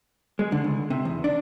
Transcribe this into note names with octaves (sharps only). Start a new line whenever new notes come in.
G#3
D3
C#2
C3
E2
D4